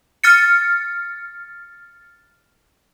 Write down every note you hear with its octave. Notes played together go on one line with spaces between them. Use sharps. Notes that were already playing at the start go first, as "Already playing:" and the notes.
F6 A6 C#7